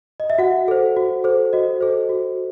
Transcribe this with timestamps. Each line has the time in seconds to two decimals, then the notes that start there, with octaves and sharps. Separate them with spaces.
0.20 D#5
0.30 E5
0.38 F#4 F#5
0.68 A4 C5
0.97 F#4
1.24 A4 C5
1.53 F#4 D#5
1.81 A4 C5
2.09 F#4